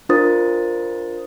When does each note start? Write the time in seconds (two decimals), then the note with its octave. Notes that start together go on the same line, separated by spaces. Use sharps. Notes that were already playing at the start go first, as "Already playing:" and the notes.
0.09 D4 F4 A#4 C5 D#6 A6